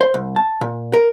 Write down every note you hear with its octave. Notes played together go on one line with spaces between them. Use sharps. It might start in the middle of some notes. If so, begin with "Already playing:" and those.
C5
C2
A5
A#2
A#4